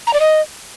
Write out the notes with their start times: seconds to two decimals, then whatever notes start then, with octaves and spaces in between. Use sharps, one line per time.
0.07 A#5
0.14 D5
0.20 D#5